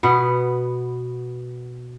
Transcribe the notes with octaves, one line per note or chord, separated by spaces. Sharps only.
B2 B3